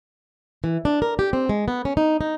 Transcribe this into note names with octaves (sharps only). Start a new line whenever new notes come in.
E3
D4
A#4
G4
C4
G#3
B3
C#4
D#4
D#4